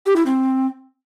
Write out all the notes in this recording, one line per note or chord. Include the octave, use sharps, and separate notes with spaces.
G4
E4
C4